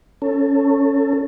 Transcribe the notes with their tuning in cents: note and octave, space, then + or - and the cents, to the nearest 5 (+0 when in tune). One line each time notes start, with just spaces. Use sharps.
C#4 +0 A4 +25